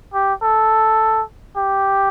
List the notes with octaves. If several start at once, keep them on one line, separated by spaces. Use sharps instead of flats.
G4
A4
G4